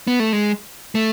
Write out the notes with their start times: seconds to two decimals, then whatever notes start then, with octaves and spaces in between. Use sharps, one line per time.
0.07 B3
0.20 A3
0.33 G#3
0.95 A3